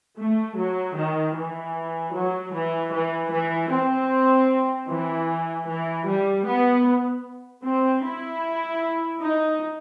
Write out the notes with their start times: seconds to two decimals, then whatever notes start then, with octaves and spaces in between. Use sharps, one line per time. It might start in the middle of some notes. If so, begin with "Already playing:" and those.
0.18 A3
0.57 F#3
0.97 D#3
1.35 E3
2.13 F#3
2.53 E3
2.93 E3
3.31 E3
3.71 C4
4.88 E3
5.68 E3
6.07 G3
6.46 B3
7.65 C4
8.04 E4
9.21 D#4